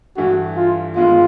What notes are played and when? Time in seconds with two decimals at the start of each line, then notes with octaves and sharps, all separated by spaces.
0.17 G2 E3 A3 D4 F#4
0.57 F4
0.96 G2 D#3 G#3 B3 F4